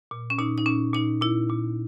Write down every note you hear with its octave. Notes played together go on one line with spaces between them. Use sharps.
A#2
C#4
A#2 D#4
D#4
A#2 C#4
A#2 D#4
A#2 E4
A#2